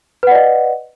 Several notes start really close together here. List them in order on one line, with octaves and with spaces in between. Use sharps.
B4 F#5 D5 D#5